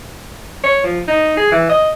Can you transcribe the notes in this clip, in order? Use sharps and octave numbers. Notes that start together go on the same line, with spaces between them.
C#5
F3
D#4
G#4
E3
D#5